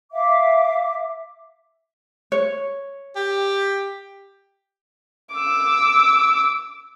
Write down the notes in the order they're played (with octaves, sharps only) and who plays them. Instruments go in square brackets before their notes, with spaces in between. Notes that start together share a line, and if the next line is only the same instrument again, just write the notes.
[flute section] E5 F5 D6
[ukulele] C#5
[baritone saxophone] G4
[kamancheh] D6 E6